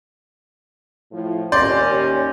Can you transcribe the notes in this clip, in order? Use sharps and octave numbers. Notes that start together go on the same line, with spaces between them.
A2 F3
D#2 C#4 D5 C6 G6 A#6